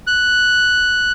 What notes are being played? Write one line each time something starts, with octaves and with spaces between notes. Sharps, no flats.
F#6